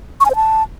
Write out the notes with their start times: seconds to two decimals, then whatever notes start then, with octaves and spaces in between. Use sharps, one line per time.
0.20 C#6
0.25 G#5
0.30 C5
0.35 A5